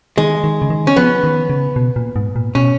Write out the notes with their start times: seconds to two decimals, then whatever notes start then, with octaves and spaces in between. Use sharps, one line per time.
0.18 D#3 G#3
0.44 D#3
0.62 C#3
0.70 D#3
0.87 C#4
0.96 F3 B3
1.24 D#3
1.50 C#3
1.76 B2
1.96 A#2
2.16 G#2
2.36 A#2
2.55 B2 C#4